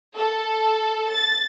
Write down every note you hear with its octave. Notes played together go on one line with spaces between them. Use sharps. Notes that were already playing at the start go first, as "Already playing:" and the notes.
A4
A6